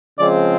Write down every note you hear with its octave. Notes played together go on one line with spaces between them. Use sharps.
C#3 F3 G#3 C4 D5